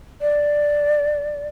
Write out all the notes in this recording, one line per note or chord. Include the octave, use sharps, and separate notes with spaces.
D5